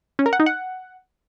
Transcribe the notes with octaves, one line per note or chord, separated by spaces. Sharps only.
C#4
A#4
F#5
D#4
F#5